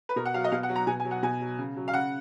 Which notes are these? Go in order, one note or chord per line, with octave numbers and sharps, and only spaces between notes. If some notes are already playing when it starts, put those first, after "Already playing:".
B4
B2 A#4
F#5
F#3 F5
D#5
B2 F5
F#5
F#3
A#5
B2 G#5
G#5
F#3
F#5
B2 G#5
F#3
C#3
F#3
F5
C#3 F#5